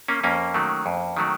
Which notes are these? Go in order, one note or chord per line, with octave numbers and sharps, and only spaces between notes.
A#3 C#4
F2 A#3 C#4
D#3 F#3 A3
F2
D#3 F#3 A3